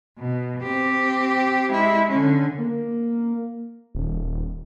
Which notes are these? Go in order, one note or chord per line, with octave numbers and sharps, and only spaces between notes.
B2
C4 G4
G#3 E4
D3 C#4
A#3
D#1